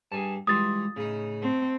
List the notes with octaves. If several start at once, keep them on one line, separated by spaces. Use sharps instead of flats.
G2 G#4 G#5 A5
E3 G3 G#3 F4 D#6 A6
A2 C#3 D#4
A3 C4